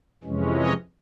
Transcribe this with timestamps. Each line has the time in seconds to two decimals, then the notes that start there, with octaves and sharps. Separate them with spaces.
0.23 F2 C3 E3 G#3 C#4
0.54 C#5 D#5